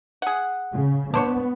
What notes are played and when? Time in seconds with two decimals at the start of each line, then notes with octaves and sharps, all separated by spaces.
0.22 G#4 F#5
0.72 C#3
1.14 B3 D4 C5 C#5